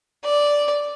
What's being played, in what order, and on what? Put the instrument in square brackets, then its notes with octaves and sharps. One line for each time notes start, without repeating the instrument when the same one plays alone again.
[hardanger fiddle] D5